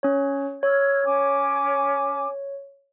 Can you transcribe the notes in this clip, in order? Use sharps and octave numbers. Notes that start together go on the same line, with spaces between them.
C#4 C#5
C#5 E6 F6 G#6
C#4 G#5 D6